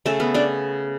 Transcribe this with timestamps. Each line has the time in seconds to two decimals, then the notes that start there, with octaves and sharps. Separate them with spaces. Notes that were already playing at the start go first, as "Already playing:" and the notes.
0.06 C#3 A3 A4
0.20 B3 B4
0.34 C#3 D4 D5